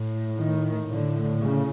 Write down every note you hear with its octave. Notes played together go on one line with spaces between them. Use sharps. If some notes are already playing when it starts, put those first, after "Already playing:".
Already playing: A2
D#3
A2 D3
C#3